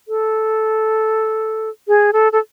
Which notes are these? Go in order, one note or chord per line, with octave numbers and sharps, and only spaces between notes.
A4
G#4
A4
A4